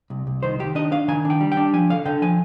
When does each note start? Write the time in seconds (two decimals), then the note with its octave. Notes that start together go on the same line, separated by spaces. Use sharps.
0.10 C2
0.27 C2
0.43 D#3 C5
0.59 D#3 G4
0.75 D4 D#5
0.92 D4 F5
1.08 D#3 G#5
1.25 D4
1.30 G5
1.41 G3
1.52 G5
1.57 D4
1.73 F3 G#5
1.90 D3 F5
2.05 D3 G5
2.22 F3 G#5